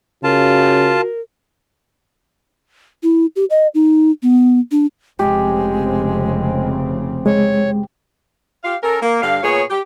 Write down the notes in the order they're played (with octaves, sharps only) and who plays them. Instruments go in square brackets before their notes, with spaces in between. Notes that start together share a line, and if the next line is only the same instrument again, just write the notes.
[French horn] C#3 [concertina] F4 A5 [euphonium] F#4 [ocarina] A#4
[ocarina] E4
G4
D#5
D#4
B3
D4
[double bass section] F1 C#3 C4 [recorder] G#3 [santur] G4
[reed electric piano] G#3 [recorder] C#5
[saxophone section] F4 G4 F5
C#4 A4 A#4
A#3
G2 D3 F5
A#2 B3 G#4 C#5
G4